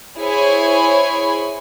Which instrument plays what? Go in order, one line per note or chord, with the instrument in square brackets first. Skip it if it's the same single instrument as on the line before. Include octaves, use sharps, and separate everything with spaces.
[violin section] E4 G#4 C5 C#5 G#5 B5